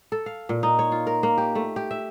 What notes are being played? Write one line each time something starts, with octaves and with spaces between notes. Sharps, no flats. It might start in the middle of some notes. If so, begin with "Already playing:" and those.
A4
F5
A#2
D#4
C#5
F4
A#4
A#3
G4
A3
G4
E5